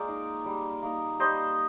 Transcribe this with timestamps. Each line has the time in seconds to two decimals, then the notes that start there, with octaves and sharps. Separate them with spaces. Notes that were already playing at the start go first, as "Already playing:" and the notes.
Already playing: G#3 A#3 F4 A#4 C5 D5 F5
0.08 D#4
0.46 G3
0.82 A#3 D#4
1.19 G3 C5 D#5